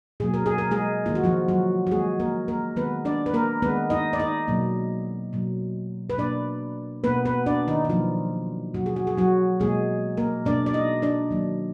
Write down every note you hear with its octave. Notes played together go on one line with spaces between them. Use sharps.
B2 F#3 A#3 G#4
A#4
G#4
A#4
G#3 G#4
D#3 A#3 F4
F#4
F3 F4
F#3 F#4
F#4
D#3 G#3 A#3 G#4
A#3 A#4
A#3 A#4
D#3 G#3 B3 B4
D4 D5
B4
A#3 A#4
D#3 G#3 B3 B4
D#4 D#5
D5
D#4 D#5
B2 F#3 A#3
B2 F#3 A#3
B4
B2 A#3 D4 D5
B2 A#3 B3 B4
B3 B4
D4 D5
D#3 D#4
D#4
B2 F3 F#3 A#3 F4
B2 F#3 A#3 F#4
G#4
F#4
G#4
F#3 F#4
B2 G#3 A#3 G#4
A#3 A#4
B2 A#3 D4 D5
D5
D#4 D#5
D4 D5
D#3 F#3 A#3